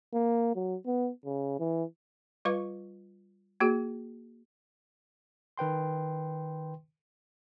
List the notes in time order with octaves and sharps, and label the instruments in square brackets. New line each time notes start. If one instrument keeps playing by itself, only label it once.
[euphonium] A#3
F#3
B3
C#3
E3
[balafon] G3 F4 B4 F5 C#6
A#3 F#4 G#4
[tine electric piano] D#3 B4 G5 C6